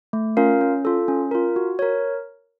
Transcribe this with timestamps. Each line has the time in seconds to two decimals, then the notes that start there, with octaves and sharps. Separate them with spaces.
0.13 A3
0.37 C#4 F4 A#4 F5
0.61 C#4
0.85 F4 A4
1.08 C#4
1.31 F4 A#4
1.56 F#4
1.79 A#4 C#5